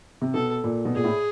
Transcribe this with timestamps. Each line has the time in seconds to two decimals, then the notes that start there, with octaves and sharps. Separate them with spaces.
0.22 C3
0.34 B2 A4
0.64 A#2
0.85 B2
0.95 A#2 G#4
1.04 A2